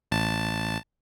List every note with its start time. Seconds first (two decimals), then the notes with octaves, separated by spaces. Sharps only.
0.12 A1 A5